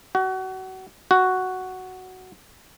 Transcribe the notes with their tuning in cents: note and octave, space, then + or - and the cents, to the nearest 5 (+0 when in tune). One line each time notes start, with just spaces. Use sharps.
F#4 +30
F#4 +5